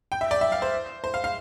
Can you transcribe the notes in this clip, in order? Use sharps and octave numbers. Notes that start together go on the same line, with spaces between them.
G5
E5
D5
E5
F5
C5
C5
F5
F5